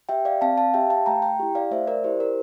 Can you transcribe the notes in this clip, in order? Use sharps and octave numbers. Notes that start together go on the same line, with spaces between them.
G4 E5 G5
D5 F5
C4 F5 A5
F5 A5
G4 E5 G5
F5 A5
A3 G5 A#5
G5 A#5
E4 G4
D5 F5
A3 C5 E5
A#4 D5
E4 G4 C5
A#4